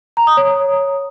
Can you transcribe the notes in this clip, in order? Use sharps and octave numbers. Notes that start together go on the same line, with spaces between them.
A#5
D#6
C#5